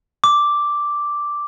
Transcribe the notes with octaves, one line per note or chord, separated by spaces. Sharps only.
D6